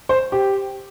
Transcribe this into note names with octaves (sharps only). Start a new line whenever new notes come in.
C5
G4